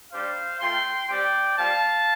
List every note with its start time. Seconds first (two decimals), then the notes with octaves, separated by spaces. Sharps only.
0.12 G3 D4 G4 C5 F5
0.61 A3 F4 G5 C6
1.09 G3 C4 G4 D5 G5
1.57 G3 C4 F4 F5 A5